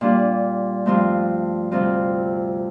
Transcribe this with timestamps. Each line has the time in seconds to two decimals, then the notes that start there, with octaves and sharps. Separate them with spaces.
0.01 A#2 G3 D4 F4
0.86 G2 F3 A3 C4 F4
1.71 D2 C3 G3 C4 F4